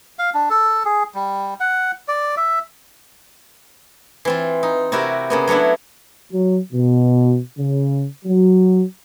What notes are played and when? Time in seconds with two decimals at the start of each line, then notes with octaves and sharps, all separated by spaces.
0.19 F5
0.34 D4
0.50 A4
0.85 G#4
1.14 G3
1.60 F#5
2.08 D5
2.37 E5
4.25 E3 C4 F4
4.63 D#4
4.92 C3 E4 F#4 G4 A#4
5.30 C#3 A#3 B3
5.48 F#3 A3 B3 D4 E4
6.32 F#3
6.73 B2
7.58 C#3
8.25 F#3